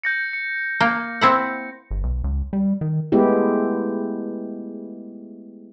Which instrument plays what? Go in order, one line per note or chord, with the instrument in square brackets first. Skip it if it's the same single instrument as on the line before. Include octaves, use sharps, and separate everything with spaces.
[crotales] G6 A#6 C#7
C#7
[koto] A#3
C4 E4 F#5
[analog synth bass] G1
B1
C#2
G3
D#3
[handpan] G#3 A3 B3 E4 G4